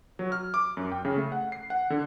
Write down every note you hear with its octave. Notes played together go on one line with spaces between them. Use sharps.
F#3
F6
D6
F#2
G5
C#3
A3
F#5
C7
F#5
D3